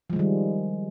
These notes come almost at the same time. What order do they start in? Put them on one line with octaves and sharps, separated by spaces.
F3 G#3 D#3 G3